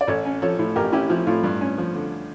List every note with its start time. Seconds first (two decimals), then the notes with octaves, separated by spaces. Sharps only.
0.01 D5
0.08 A1 A4 C#5
0.25 C#4
0.42 F3 A4 C#5
0.59 A2
0.76 A1 G4 A#4
0.92 C#4 E4 G4
1.09 F3 E4
1.27 A2 F4
1.43 G2
1.61 C#4
1.78 F3
1.94 D3